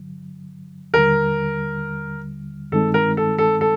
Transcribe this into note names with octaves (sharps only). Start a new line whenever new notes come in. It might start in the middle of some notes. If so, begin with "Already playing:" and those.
Already playing: G2 D3 F#3
D#2 D3 G3 A#4
G2 D#3 G#3 C4 D#4 A4
A#4
A4
A4
A4